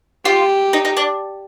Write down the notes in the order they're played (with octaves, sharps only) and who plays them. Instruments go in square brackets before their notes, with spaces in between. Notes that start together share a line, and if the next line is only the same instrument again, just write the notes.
[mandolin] F4 [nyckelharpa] G4
[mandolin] D#4
D#4
D4